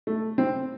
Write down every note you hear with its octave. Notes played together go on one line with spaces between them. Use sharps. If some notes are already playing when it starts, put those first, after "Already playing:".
A3
C4